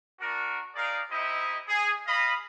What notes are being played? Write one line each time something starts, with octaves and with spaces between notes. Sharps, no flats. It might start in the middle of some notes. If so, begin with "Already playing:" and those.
D4 F#4 A#4
D#4 G#4 A#4 D5 F5
D#4 E4 G4 C5 D#5 E5
G#4
D#5 F5 B5